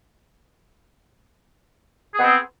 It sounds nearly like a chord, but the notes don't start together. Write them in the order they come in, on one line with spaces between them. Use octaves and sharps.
G#4 B3 C4